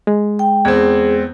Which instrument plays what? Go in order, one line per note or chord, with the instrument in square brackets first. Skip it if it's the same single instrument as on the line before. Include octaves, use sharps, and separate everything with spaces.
[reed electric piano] G#3
[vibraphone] G5
[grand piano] E2 C4 [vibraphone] G#4